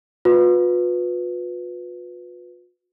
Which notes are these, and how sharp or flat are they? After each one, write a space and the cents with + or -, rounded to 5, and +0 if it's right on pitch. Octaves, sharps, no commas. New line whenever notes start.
F4 +45 B4 +0